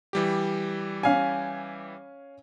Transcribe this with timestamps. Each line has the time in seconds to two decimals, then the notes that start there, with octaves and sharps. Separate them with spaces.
0.13 E3 G3 G4
1.03 C#4 F5 G#5